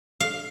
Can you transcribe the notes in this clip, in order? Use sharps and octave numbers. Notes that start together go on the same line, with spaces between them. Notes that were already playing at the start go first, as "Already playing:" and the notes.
F5